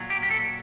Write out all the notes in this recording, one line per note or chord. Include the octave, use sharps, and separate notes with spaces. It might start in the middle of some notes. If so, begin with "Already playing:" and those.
Already playing: A#2 F#3
G4
G4
A4